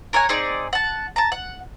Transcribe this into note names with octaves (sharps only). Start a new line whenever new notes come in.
A#4 C#5 F#5 G#5
C4 D#4 G#4 D5
F#5 A5
A5 A#5
F#5